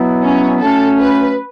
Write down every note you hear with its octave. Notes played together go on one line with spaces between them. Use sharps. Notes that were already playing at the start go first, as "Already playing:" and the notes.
Already playing: B2 F#3 B3 E4
C#4
F#3 A3 C#4 A4
B4